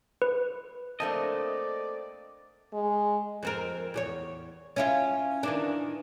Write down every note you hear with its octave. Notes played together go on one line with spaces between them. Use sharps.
B4
A3 A#3 C4 D4 A4 D5 D#5 A5
G#3
F2 C4 A#4
E2 G4 C#5
C#4 E4 F4
D#3 E3 D4